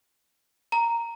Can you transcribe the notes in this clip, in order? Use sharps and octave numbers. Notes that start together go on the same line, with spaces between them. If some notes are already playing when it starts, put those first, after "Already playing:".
A#5